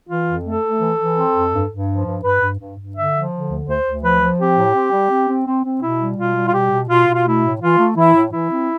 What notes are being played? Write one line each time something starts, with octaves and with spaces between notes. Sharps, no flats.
E3 F4
F2
A3 A4
A3
E3
E3
C4
F2
G2
G2
F3
G2
G2 B4
G2
G2
G2
D3 E5
F3
D3
D2
D2 C5
D2
F3 B4
F3
C4 G4
A2
C4
G3
C4
C4
C4
C4
B2 E4
G3
B2 F4
G3
F4
B2 G4
B2
B2 F4
B2
F4
A3 E4
A2
E3 F4
A3
E3 E4
A2
E3 E4
C4